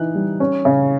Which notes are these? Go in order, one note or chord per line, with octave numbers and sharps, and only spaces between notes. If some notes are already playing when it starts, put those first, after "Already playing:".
Already playing: E3 D#4 F#6
G3
C#4
C#3